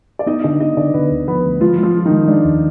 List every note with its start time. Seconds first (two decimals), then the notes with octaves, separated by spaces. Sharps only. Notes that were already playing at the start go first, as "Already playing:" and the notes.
0.19 D5
0.26 B3 D#4 D#5
0.44 D3 D4 D5
0.60 B3 D#4 D#5
0.77 D3 D4 D5
0.94 D3 B3 B4
1.10 D2
1.28 F3 B3 B4
1.44 D2
1.61 F3 G#3 F4
1.78 G#3
1.83 F3 F4
1.94 G#3
2.05 D#3 D#4
2.11 G#3
2.28 G#3 D4
2.45 D#2